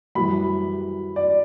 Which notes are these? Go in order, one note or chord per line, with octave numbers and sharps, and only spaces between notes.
F#2 E3 G3 B5
D5